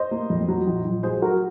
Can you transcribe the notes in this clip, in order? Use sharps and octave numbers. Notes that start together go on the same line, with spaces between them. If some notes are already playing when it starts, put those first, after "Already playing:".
Already playing: C5 D#5
A#3
F2
F#3
A#1
A#1
F#3 G#4 C5
F#3 F#4 A#4